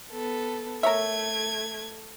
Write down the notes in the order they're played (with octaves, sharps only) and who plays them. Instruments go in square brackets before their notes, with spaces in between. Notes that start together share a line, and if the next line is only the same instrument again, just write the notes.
[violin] B3 A4
[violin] A3 G#6 [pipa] A#4 C#5 E5